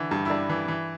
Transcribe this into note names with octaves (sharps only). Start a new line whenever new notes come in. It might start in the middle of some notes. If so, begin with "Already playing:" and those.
Already playing: D3 E3
G2
E4
G2 D4
E3
E3